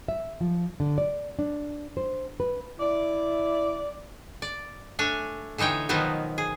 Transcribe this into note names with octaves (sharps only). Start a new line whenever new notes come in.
E5
F3
D3
D5
D4
C5
B4
E4 D5
D5
A3 D4 C#5 G#5
D3 E3 D#4 C#5 G5
B2 D#3 F3 F#3 B3 D#4
G#4